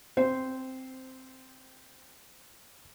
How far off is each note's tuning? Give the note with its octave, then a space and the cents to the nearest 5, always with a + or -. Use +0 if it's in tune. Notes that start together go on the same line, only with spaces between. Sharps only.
C4 +0 C5 -10